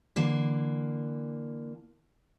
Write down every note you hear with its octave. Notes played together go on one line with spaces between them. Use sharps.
D3 E3 A#3